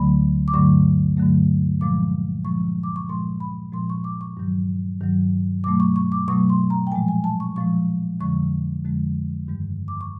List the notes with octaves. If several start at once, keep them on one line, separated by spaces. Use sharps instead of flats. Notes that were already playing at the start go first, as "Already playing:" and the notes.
Already playing: D2 D3 F#3 A3 B5
D6
G2 D3 F#3 A3 C#6
G2 D3 F#3 A3
A#2 F3 G#3 D6
A#2 F3 G#3 C#6
D6
C#6
A#2 F3 G#3 C6
B5
A#2 F3 G#3 C6
C#6
D6
C#6
G2 D#3 F#3
G2 D#3 F#3
B2 F#3 A3 D6
C#6
C#6
D6
B2 F#3 A3 C#6
C6
A#5
G5
A#2 F3 G#3 G#5
G#5
A5
C#6
A#2 F3 G#3 C#6
F2 D3 F3 G#3 C#6
F2 D3 F3 G#3
G2 D#3 G3
D6
C#6